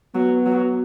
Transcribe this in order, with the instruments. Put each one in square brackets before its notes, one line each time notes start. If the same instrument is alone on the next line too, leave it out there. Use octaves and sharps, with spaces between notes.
[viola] F#3 [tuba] B3
[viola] F#3